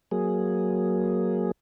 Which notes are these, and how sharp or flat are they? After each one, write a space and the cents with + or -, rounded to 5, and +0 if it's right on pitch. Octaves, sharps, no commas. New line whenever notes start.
F#3 +0 A#3 +0 G#4 +0